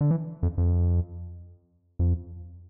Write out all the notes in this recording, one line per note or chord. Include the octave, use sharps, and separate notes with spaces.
D3
E3
F2
F2
F2